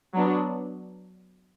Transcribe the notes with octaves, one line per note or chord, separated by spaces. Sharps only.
F#3 B3 D4